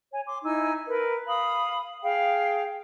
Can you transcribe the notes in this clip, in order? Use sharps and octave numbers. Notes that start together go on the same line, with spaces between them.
C#5 G#5
C6 D6
D#4 E4 G#5 E6
A#4 B4
F5 B5 D#6
G#4 F5 G5